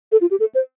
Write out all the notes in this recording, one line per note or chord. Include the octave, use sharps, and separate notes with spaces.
A4
F4
G4
A4
C5